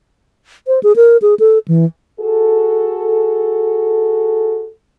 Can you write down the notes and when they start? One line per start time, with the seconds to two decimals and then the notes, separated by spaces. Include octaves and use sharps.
0.67 C5
0.83 G#4
0.96 A#4
1.22 G#4
1.39 A4
1.68 E3
2.20 F#4 G#4 A4